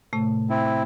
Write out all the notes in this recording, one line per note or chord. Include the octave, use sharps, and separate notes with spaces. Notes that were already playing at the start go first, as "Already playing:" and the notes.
A2 C3 A3
C4 E4